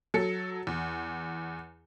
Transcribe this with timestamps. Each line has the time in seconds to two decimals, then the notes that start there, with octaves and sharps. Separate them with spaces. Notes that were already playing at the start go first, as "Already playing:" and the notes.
0.14 F#3 A4 C#7
0.67 E2